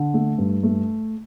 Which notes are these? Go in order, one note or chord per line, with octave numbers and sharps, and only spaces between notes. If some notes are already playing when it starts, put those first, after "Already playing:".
Already playing: D3
A3
G2
A3